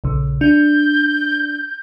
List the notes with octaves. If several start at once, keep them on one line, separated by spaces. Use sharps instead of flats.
A#1 C#3
D4 G6